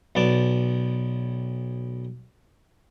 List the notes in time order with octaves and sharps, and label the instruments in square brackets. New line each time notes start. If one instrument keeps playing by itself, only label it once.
[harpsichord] B1 B3 D5 A5